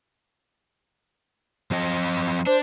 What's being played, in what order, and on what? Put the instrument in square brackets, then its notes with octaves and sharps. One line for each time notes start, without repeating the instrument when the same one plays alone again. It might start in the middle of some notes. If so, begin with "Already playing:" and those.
[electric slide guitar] F3 C4 D#5
[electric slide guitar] D4 [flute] C5